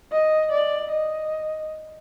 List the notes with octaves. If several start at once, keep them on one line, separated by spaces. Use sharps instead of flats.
D#5
D5
D#5